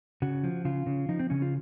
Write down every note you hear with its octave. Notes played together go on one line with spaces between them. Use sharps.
C#3 F#4
F3
C#3 F4
C#3
F3 D#4
C4
C#3 C#4
F4